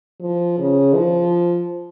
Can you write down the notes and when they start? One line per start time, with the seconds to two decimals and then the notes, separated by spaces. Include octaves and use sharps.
0.21 F3
0.58 C#3
0.95 F3